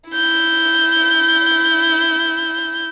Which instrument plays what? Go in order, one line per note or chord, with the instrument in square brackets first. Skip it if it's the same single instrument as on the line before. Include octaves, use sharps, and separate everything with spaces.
[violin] E4 G6